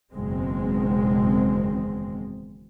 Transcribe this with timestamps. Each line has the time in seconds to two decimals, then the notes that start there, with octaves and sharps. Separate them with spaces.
0.12 F#1 E2 B2 D#3 G#3 C4